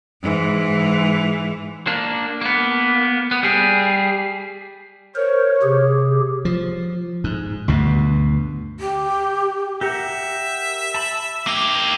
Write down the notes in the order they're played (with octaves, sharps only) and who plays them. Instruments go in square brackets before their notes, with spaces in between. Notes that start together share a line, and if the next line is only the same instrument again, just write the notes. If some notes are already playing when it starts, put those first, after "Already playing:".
[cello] G#2 E3
[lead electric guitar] A#3 D4
A#3 B3
B3
G3 G#4
[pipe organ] A#4 C5 [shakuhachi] C#5
[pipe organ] C3 G4 G#4
[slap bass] F3
G#2
D2 G2 B2
[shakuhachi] G4
[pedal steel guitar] G4 A#4 F#5 [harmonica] E5
[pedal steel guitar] A5 B5
[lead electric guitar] A#3 G4